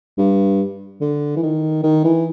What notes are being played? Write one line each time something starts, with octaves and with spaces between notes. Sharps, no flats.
G2
D3
E3
D#3
D#3
E3